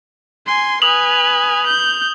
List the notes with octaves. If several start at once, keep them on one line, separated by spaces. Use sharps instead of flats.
G#5 C6
B4 G#5 D#6 F7 F#7
G6